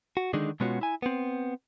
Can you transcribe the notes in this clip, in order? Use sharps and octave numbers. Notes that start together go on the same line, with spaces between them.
F#4
D3 D#3 G#3 D4 D#4
B2 G#3 B3 C#4 F4 F#4
E4 G#5
B3 C4